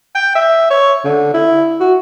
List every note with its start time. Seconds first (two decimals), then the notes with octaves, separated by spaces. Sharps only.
0.15 G5
0.35 E5
0.71 C#5
1.05 D3
1.34 E4
1.80 F#4